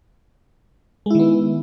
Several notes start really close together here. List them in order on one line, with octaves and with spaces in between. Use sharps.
G#3 E4 D#3 B3